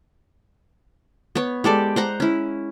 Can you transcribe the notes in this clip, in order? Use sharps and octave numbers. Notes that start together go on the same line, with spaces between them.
B3 C#5
G#3 G4 A4 D5
C5 F#5 A#5
C#4 E4